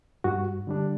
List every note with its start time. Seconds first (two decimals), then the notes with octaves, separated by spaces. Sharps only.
0.24 G2 F#4
0.67 D3 G3 D4